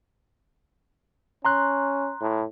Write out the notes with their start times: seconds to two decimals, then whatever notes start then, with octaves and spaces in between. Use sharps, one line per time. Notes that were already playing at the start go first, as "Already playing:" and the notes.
1.45 C#4 A#5 C6 F#6
2.21 A2